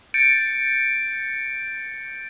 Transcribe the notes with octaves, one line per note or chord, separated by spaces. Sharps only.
G6 A6 C#7 D7